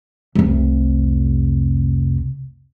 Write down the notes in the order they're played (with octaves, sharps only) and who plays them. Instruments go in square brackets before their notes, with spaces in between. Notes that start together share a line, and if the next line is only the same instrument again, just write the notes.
[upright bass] F1 C2